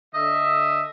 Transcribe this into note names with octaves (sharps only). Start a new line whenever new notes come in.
D3 D#5 E5